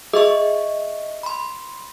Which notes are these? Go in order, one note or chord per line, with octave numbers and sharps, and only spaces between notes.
G#4 D#5 E5 C#6
B5 C6